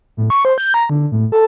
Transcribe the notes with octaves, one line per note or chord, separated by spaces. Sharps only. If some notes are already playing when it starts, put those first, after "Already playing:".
A2
C#6
C5
G6
A#5
D3
A2
A4